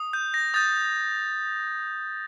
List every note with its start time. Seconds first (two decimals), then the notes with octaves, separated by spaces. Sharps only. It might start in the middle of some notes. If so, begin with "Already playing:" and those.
Already playing: D#6
0.13 G6
0.34 A#6
0.54 D#6 G6 A6